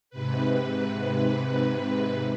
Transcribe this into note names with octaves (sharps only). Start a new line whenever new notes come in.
G#2 C3 B4